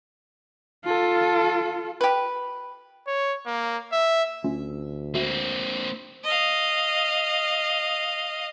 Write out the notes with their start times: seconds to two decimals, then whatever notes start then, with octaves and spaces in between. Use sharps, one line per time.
0.85 F4 A4
2.01 G4 B4
3.08 C#5
3.46 A#3
3.92 E5
4.44 D2 A3 C#4 F4
5.15 A#3 C4 F#4 E5
6.24 D#5 F5